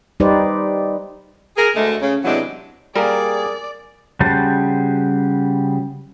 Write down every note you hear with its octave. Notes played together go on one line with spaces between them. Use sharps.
G3 D#4 G4 B4 C5 D5
G#4 A#4
D2 G#3 A3
C#3
C3 E3 F#3 G#3 B3 D4
G3 A#3 G#4 A#4 D5
C#3 G3 F#4 C5 A5